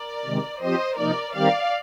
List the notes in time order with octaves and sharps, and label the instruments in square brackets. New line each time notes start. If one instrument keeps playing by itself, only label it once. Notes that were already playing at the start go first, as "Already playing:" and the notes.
Already playing: [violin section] A#4 D5
[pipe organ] C3 D#3 G#3
[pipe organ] F3 C4 G4 [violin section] C5 D#5
[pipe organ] C3 F3 A#3 D#4 [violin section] A#4 D5
[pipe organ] D#3 G3 C4 G4 A#4 [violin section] D5 F5